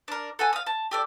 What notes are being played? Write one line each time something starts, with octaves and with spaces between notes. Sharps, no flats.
D4 A#4
A4 F#5 G#5
F5 D#6
A5
G4 A4 D5